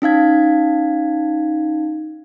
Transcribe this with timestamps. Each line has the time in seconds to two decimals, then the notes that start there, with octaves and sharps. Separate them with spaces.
0.02 C#4 D#4 F5 G#6